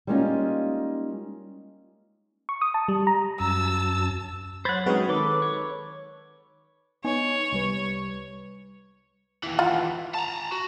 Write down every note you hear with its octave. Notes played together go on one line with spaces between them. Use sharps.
G3 G#3 A#3 C#4 D#4 F4
C#6
D#6
A5
G3
A#5
F#2 A5 E6
F#3 C5 F#5 B5 G#6 A6
G#3 C4 C#4 D#4 F#4 B4
D#3 A4 B4 D6
C#5
B3 D#4 C#5 G#5
C2 G3 B4
D#2 E3
F4 F#5 B5
A5 A#5
F#4